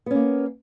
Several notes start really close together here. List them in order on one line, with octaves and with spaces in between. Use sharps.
B3 C#4 A#3